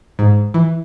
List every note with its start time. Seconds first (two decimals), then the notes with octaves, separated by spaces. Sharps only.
0.19 G#2
0.54 E3